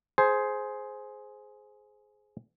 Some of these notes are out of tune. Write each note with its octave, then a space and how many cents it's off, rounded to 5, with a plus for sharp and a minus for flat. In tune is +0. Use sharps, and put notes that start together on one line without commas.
G#4 +15 C5 +0